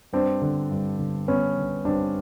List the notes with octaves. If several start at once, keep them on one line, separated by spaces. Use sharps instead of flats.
G2 C4 D4
D3
G2
D3
G2 B3 C#4
D3
G2 C4 D4